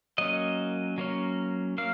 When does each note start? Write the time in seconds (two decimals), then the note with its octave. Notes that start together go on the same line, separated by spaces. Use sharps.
0.18 F#3 A#3 C#4 D#5
0.98 F#3 A#3 C#4
1.78 F#3 A#3 F5